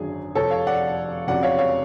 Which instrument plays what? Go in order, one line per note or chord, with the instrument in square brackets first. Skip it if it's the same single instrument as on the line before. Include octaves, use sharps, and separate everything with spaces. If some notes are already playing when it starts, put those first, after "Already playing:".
Already playing: [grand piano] G#1 F#2 D3 F#3 G#4
F1 F2 F3 A4 C#5
C#5 F5
D5 F#5
F1 F2 C#3 F#3 D5 F#5
C#5 F5
C#5 F5